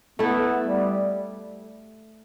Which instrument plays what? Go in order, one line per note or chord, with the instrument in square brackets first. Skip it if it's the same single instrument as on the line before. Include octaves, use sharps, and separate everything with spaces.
[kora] A3 E4 A4 [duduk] B3
[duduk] G3